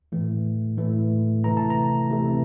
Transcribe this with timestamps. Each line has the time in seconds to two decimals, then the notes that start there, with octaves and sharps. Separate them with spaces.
0.12 A2 E3 A3
0.78 A2 E3 A3
1.44 C3 E3 A3 A#5
1.57 A5
1.70 A#5
2.10 C3 E3 A3